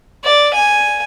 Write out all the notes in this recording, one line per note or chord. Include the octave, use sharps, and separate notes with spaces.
D5
G#5